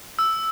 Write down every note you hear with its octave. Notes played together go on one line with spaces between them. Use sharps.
E6